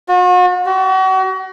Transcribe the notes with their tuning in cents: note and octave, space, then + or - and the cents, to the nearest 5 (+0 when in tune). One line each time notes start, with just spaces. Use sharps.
F#4 -40
F#4 +35